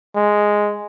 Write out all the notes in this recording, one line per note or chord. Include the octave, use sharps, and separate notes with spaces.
G#3